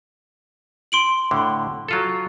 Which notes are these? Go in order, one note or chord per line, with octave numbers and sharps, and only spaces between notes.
C6 D7 F#7
A2 D3
F#3 F4 A4